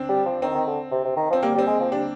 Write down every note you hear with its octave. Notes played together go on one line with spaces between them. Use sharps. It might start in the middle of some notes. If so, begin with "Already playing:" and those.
Already playing: C4 D4
G3
F3
D#3 C4
D#3
D3
C3
C3
D#3
F3 C4
G3 A#3
G3 C4
G#3
F3
G3 D4